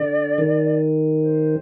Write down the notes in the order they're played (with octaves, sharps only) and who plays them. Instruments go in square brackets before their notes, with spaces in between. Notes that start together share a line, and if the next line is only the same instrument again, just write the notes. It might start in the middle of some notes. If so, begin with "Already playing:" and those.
Already playing: [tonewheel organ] D3 [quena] D5
[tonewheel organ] D#3
[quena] C5